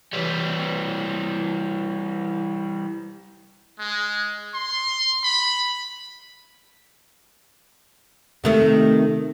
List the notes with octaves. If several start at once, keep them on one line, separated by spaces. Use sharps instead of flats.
E3 G3
G#3
C6
B5
C3 D#3 A3